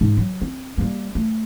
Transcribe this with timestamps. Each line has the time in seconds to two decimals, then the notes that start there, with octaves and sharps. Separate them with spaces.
0.01 G#2
0.17 F#3
0.42 C4
0.78 G3 A#3
1.15 A3